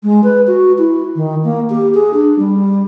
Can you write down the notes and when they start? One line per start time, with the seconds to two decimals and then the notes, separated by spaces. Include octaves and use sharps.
0.03 G#3
0.24 B4
0.47 F#4
0.78 E4
1.16 D#3
1.44 A#3
1.70 G4
1.94 G#4
2.14 D4
2.39 G3